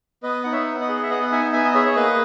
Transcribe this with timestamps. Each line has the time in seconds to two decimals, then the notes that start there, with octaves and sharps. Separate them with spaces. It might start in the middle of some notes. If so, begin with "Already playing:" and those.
0.23 B3 B4 D#5
0.44 D#4 F#5
0.52 C#5 E5
0.67 B3
0.81 D#5 F#5
0.89 G#4
1.02 E5
1.10 B3 D#5 F#5
1.23 F#5
1.31 D#4 E5 G#5
1.53 B3 E5 G#5
1.65 D#5
1.74 G#4 C#5 E5
1.86 C#5
1.96 A#3 B4 D#5